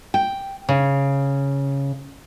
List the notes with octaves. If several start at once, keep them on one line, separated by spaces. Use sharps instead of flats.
G5
C#3